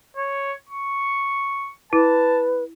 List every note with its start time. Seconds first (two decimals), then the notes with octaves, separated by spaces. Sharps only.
0.16 C#5
0.69 C#6
1.93 E4 B4 A5